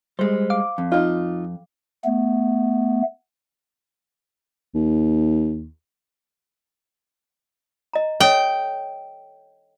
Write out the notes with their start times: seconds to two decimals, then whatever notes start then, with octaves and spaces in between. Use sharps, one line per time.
0.19 G3 G#3 C5
0.50 F5 D6
0.78 F2
0.92 D#4 F4
2.05 A3 B3
4.75 D#2
7.93 D#5 A#5
8.20 A4 C#5 D#5 G5